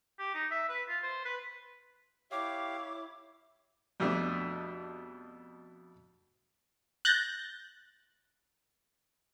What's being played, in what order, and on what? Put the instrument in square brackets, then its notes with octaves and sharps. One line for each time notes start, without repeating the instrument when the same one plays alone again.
[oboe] G4
D#4
E5
B4
F4
C5
B4
[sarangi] E4 [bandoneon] G4 F5 [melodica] C#5 [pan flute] D6
[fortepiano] F2 B2 G3 A3 D4
[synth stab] F#6 G6 A6 A#6